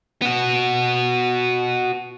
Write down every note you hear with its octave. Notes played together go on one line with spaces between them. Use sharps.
B3 F#4